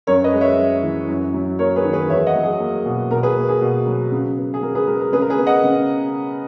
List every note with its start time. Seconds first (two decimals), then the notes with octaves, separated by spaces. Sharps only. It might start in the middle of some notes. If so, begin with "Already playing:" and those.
0.07 F#2 A#4 C#5
0.24 B4 D#5
0.33 G#3
0.41 C#5 E5
0.58 F#2
0.83 E3
1.08 F#2
1.34 F#3
1.59 A#3 A#4 C#5
1.76 G#4 B4
1.84 D#3
1.93 G#4 B4
2.10 E2 C#5 E5
2.27 D#5 F#5
2.35 F#3
2.43 G#4
2.60 A#3
2.86 B2
3.11 B2 A#4
3.23 G#4 B4
3.36 A#3
3.49 G#4
3.61 B2
3.86 F#3
4.12 C#3
4.37 B3
4.54 G#4
4.62 C#3 A#4
4.75 G#4 B4
4.87 G#3 A#4
5.00 A#4
5.13 C#3 G#4 B4
5.21 A#4
5.30 G#4 B4
5.38 B3
5.46 D#5 F#5
5.64 C#3